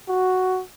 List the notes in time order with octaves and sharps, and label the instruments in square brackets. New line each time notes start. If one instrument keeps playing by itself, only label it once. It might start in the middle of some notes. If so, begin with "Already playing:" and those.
[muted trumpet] F#4